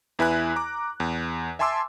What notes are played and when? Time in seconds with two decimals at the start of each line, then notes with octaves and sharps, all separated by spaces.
0.19 E2 E4 B4 G#5 F#6
0.56 A#5 D6
1.00 E2
1.59 E5 G#5 A5 C6 D6 E6